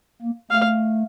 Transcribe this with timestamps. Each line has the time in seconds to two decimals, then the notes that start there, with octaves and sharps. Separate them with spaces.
0.22 A#3
0.51 A3 F5